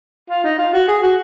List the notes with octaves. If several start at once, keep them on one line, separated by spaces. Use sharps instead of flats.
F4
D#4
F4
F#4
G#4
F#4